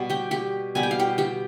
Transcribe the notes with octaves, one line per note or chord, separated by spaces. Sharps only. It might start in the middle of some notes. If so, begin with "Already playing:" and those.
Already playing: B2 G3 B3
G4 G5
G4 G5
B2 G3 B3 G#5
G5
F5
G4 G5
G4 G5